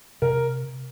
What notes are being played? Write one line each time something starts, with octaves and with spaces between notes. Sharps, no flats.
C3 A#4